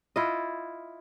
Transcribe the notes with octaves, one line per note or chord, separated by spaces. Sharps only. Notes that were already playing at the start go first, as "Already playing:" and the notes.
E4 F4 D#5